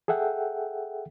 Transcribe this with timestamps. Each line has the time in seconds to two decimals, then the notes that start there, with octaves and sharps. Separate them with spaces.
0.08 G#4 A4 E5 F#5 G5